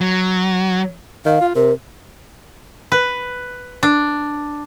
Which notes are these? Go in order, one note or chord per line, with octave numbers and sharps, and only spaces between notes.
F#3
D#3 F5
F4
C3 A#4
B4
D4